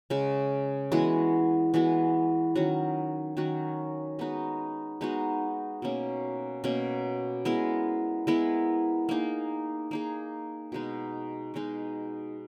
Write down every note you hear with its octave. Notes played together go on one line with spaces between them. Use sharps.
C#3 G#3 C#4
E3 G#3 B3 F#4
E3 G#3 B3 F#4
D#3 F#3 C#4 F#4
D#3 F#3 C#4 F#4
G#3 B3 D#4 F#4
G#3 B3 D#4 F#4
B2 A#3 C#4
B2 A#3 C#4
G#3 B3 E4 A#4
G#3 B3 E4 A#4
A#3 D#4 G#4
A#3 D#4 G#4
B2 G#3 D#4
B2 G#3 D#4